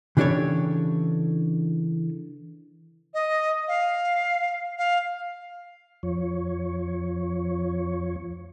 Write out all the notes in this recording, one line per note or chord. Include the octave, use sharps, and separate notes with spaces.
C#3 E3 D4 G4 A4 C#5
D#5
F5
F5
F2 F3 C#5